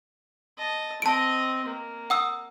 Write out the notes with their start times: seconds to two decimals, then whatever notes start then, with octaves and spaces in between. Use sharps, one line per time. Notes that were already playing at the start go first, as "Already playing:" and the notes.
0.58 D#5 A5
1.02 C4 D#5 A5 D7
1.65 A#3
2.10 F#5 D#6 E6